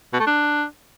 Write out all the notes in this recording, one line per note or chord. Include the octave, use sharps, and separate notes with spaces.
B2
A3
D4